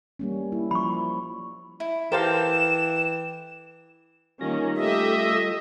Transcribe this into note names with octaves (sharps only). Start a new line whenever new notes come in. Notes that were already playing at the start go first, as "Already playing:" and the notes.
G3 A#3 C#4
E4
F3 B5 C#6
E4
E3 G4 A4 A#4 C5 F5 G5 E7
D#3 G3 A#3 C#4 F4 A#6
A3 G4 D#5 E5